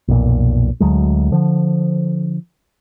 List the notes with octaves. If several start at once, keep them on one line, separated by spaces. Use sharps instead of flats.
B1 F2 A#2
D2 F#3 G#3
D3 F3